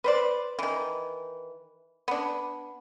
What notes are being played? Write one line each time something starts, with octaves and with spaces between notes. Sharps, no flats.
B4 C5 D5
D#3 E3
B3 D4